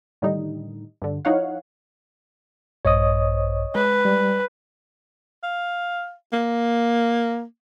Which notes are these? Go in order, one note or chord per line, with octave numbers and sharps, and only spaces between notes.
A2 D3 D#3 G3 D#4
G2 D3
F3 D#4 E4 C#5 F5 F#5
A#1 G2 C5 C#5 D#5 D#6
G#3 B4
G3
F5
A#3